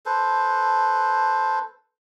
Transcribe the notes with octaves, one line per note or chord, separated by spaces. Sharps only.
A4 B4 C5